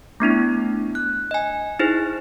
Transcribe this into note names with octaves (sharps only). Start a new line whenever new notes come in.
A3 B3 D4 E4
F#6
D#5 G#5
D#4 E4 G#4 C5